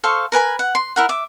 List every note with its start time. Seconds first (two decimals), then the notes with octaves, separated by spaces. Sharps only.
0.04 A4 C5 F5 C#6
0.32 A#4 B4 G#5 B5
0.59 F#5
0.75 C6
0.96 E4 A#4 F#5
1.09 E5 D6